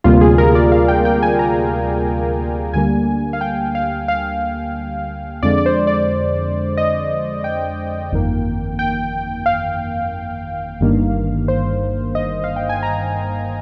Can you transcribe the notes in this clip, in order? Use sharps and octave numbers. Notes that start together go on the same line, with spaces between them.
D2 C3 G3 A#3 F4
G#4
A#4
D5
F5
G5
G5
G#5
A#5
D2 D3 G3 A#3 G#5
F5
G5
F5
F5
F2 D3 G#3 D5
D5
C5
D5
D#5
G5
G1 F2 D#3 A#3
G5
F5
G1 G2 D#3 A#3
C5
D#5
F5
G5
G#5
A#5